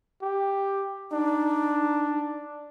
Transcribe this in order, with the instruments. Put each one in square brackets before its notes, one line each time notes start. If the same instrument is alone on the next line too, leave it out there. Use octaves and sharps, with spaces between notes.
[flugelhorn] G4
[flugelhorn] D4 [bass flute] D#4